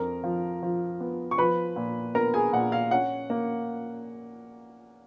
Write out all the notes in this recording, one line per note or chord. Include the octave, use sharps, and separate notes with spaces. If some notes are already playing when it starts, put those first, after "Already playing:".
Already playing: F2 A#4 A#5
F3
F3
B3
C#6
F3 B4 B5
A#2
B3 A#4 A#5
G#4 G#5
A#2 F#5
F5
C#4 F#5
A#3